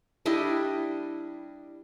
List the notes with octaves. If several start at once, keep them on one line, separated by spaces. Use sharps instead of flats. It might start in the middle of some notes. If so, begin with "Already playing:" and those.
G3 D4 E4 D#5